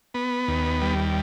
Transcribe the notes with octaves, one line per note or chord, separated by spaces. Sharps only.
B3
D#2
G3